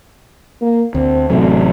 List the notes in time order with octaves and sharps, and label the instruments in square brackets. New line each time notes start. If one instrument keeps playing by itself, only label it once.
[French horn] A#3
[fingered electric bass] D2 [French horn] C4
[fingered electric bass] A1 C3 F#3 [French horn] A3